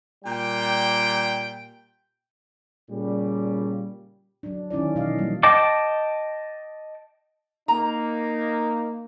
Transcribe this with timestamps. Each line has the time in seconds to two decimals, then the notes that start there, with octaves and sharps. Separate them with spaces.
0.23 A#2 G3 G5
2.90 A#2 C#3 G3
4.43 F#3 D4
4.70 D#3 C#4 E4 D5
4.95 B2 D#3 E3 F#3 D#5 F5
5.18 D#3 E3 F#3 G3 A#3
5.43 D#5 G5 A5 D6
7.68 A#3 D#4 A#5